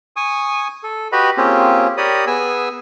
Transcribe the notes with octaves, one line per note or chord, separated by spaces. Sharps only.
G#5 C#6 D#6
A4
F#4 G4 B4 D#5 B5
A#3 C4 C#4 F4 G4 G#4
G4 A#4 C#5 D5 B5 D#6
B3 G#4 G#5 E6